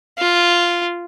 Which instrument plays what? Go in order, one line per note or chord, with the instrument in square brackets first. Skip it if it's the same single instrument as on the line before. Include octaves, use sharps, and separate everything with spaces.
[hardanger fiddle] F4